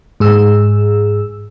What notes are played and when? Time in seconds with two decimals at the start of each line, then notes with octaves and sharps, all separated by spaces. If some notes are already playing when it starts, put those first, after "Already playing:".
0.20 G#2 G#4 E6